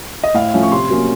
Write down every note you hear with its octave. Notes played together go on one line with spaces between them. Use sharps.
D#5
A2 F5
F3 A3 C#4
C#6
C3 C6
F#3 A#3 C#4